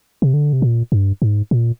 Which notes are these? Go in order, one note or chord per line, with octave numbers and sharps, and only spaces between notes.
C3
D3
C3
A#2
G2
G#2
A#2